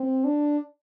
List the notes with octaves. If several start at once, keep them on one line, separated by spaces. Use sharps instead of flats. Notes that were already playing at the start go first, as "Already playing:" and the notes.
Already playing: C4
D4